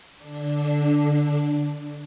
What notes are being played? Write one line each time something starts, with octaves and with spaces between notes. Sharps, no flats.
D3 D4